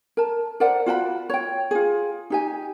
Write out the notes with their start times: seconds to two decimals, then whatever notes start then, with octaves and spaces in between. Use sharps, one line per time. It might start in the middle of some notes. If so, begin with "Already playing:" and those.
0.17 A#4 A5
0.60 A#4 C5 D5 F#5
0.86 F4 F#4 G5 B5
1.30 C#5 G5
1.71 F4 G#4
2.30 D#4 G4 G#5